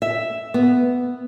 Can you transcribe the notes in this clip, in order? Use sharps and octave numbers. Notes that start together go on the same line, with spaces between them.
E5
B3